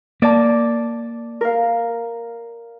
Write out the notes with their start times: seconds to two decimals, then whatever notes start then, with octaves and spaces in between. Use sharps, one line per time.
0.22 A#3 D5 A5
1.41 A#4 F5